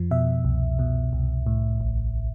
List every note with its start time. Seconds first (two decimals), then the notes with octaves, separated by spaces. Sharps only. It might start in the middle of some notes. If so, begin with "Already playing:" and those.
Already playing: F2 F3
0.11 B2 E5
0.45 C2
0.79 B2
1.13 C2
1.46 A2
1.81 A1